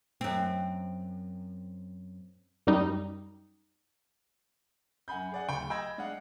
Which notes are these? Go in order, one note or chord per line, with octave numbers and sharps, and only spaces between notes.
F#2 C4
F#2 G3 D#4
F#2 F#5 G#5 B5 G6
G#4 D5 F#5
D1 D2 G5 B5 C#6
D#5 G5 B5 E6 G#6 A#6
G#3 D4 D#5 F5 F#5